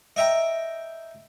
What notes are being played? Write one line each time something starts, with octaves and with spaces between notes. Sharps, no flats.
D#5 E5 G5 A#5